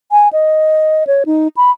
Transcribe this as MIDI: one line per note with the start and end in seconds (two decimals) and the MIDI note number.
0.11 0.28 80
0.33 1.06 75
1.07 1.23 73
1.26 1.48 63
1.57 1.71 83